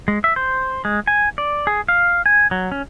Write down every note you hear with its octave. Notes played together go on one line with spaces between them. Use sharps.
G#3
E5
C5
G#3
G#5
D5
G#4
F5
G#5
F#3
C#4